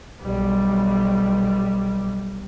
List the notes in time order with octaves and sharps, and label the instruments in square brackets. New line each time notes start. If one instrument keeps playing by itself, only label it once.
[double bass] B1 G3